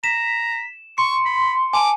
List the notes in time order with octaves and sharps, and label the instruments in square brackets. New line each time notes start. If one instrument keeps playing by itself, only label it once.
[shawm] A#5 [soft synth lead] B6 [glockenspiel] E7
[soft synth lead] C6 [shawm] C#6 [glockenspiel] C#7
[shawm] B5
[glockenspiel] G#5 A5 [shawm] D6